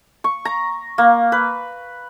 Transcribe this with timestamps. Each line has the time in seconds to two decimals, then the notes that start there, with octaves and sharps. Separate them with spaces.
0.24 C#6
0.45 A#5
0.98 A#3
1.32 B4